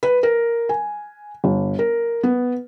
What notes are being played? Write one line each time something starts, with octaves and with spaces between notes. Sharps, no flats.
B4
A#4
G#5
G1
A#4
B3